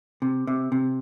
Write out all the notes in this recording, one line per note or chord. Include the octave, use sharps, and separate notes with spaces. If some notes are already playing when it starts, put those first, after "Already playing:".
C3
C3
C3